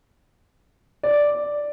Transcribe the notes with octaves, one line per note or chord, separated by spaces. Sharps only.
D5